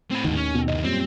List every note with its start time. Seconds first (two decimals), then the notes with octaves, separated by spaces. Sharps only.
0.11 A2 C4 B4
0.25 D#2 G#2 D3 D#3
0.36 C#4
0.54 B2
0.68 C2 G2 D#5
0.84 F#2 A#2 G3 C4